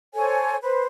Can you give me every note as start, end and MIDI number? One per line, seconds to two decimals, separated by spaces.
0.15 0.57 69
0.15 0.57 72
0.15 0.57 73
0.15 0.57 80
0.62 0.85 71
0.62 0.85 72